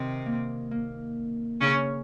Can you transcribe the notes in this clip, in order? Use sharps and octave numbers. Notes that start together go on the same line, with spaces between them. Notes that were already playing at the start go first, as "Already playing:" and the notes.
Already playing: C3 D#3 C4
A#3
A#3
C#3 C#4